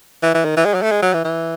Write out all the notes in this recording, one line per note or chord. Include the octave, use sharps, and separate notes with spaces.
E3
E3
D#3
E3
G#3
F#3
A3
G#3
F#3
E3
E3